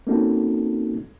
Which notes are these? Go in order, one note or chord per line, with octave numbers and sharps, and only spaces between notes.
A#3 C4 C#4 D#4 F#4 A4